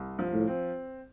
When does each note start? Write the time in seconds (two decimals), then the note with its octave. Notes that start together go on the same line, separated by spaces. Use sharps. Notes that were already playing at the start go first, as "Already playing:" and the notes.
Already playing: C2
0.19 F3
0.33 A2
0.47 C4